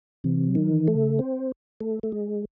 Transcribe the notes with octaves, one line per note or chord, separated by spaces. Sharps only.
C3 E3
F#3
D#3
E3
A3
C#3
C4
A3
A3
G#3